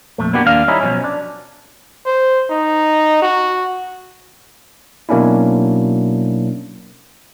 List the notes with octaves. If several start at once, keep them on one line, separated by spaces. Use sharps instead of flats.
F2 A#2 A3
A#3 B3 D4 F#4 G4
D#2 A#3 D4 F5
G3 C#4 D#4 E4
B1 B2 D3 F3 C#4
D4
C5
D#4
F#4
B2 F#3 A#3 C#4 D4 E4